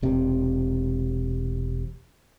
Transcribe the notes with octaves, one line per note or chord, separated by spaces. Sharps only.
E1 C3